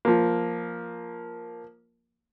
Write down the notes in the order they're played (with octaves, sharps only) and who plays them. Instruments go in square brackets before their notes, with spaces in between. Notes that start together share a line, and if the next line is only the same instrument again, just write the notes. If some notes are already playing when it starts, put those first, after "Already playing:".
[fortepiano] F3 A#3